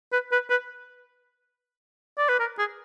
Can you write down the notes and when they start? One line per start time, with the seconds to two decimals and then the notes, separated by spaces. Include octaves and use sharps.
0.12 B4
0.32 B4
0.50 B4
2.18 D5
2.29 B4
2.40 A#4
2.58 G#4